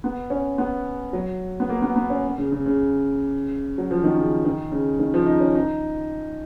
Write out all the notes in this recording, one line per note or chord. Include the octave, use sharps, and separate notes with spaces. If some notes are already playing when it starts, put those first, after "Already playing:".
B3
C#4
B3
F#3
B3
A#3
B3
B3
C#4
C#3
C#3
C#3
F#3
F3
D#3
C#3
D#3
C#3
D#3
F3
D#4
C#4
D#4